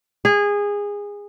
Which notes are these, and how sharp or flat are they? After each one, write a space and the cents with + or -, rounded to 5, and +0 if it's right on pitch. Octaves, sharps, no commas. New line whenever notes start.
G#4 -20